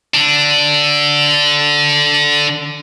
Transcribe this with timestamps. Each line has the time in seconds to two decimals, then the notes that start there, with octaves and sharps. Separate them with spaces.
0.14 D3 D4